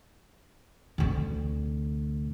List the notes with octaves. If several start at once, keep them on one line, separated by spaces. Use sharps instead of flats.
D2 C3